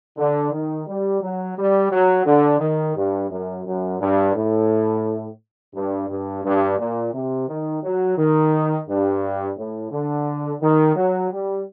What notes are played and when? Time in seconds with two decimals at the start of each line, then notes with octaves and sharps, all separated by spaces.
0.18 D3
0.52 D#3
0.87 G3
1.22 F#3
1.57 G3
1.91 F#3
2.26 D3
2.60 D#3
2.96 G2
3.30 F#2
3.66 F#2
4.00 G2
4.35 A2
5.75 G2
6.08 G2
6.44 G2
6.78 A#2
7.13 C3
7.48 D#3
7.83 F#3
8.17 D#3
8.88 G2
9.57 A2
9.91 D3
10.61 D#3
10.96 F#3
11.31 G3